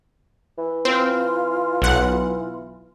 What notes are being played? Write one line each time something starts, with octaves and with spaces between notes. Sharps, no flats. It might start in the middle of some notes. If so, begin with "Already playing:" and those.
E3
C4 F4
B1 F#5